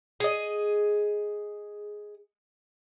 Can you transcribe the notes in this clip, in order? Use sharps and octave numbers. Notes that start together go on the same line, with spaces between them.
G#4 D#5